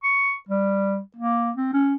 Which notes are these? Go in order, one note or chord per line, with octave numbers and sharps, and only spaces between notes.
C#6
G3
A#3
C4
C#4